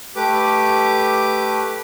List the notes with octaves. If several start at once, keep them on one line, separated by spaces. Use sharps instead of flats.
A3 G4 B4 D6